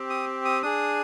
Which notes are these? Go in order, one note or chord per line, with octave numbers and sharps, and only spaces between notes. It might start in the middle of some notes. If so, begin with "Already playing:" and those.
Already playing: C4 G4
D#6
D#6
D4 G#4 D#6